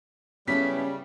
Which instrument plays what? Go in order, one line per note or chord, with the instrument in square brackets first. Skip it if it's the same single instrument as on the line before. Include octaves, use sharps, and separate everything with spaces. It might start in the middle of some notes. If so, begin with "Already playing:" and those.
[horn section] C#3 G3 [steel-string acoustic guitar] B3 E4 A4 [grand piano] C#4 [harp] B6